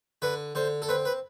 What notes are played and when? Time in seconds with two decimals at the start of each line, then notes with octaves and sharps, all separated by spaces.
0.22 D3 B4
0.55 D3 C5
0.82 A4
0.89 C4 B4
1.05 B4